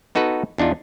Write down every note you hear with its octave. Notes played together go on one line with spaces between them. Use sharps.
B3 D#4 F#4 A4 B4
E2 D4 D#4 F4